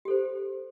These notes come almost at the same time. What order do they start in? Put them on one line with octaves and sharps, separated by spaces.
G4 A4 C5